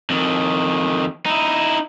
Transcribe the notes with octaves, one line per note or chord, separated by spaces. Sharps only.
F2 D#3
D#4 E4